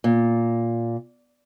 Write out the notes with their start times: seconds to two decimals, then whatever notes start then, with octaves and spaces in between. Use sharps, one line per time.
0.04 A#2